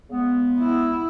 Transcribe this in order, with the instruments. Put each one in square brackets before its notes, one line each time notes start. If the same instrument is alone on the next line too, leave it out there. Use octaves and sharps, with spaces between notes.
[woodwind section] C#3 G#3 B3
[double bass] E4